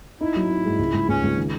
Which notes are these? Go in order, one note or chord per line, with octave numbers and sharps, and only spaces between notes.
D#4 E4
F#3
D#4
G#2
C#2
C#2
C#2 C#4
C#2
D#3